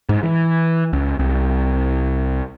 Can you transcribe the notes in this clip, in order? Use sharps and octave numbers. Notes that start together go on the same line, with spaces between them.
G#2
E3
C#2
C2